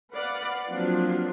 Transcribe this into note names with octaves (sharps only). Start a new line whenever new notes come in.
B4 D5 F5 F#5
F3 F#3 A#3 C4 D4 F4